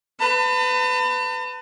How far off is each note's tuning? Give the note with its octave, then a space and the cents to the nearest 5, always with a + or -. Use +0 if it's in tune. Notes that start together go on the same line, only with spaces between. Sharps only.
B4 +25 A5 +45